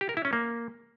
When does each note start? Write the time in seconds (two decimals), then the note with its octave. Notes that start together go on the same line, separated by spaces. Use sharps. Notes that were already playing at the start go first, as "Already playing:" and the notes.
0.01 G4
0.09 A#4
0.17 E4
0.25 C#4
0.33 A#3